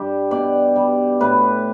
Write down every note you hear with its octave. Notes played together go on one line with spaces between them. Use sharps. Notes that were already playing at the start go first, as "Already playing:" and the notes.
Already playing: G2 G3 G4
B2 D5
G3
A2 B4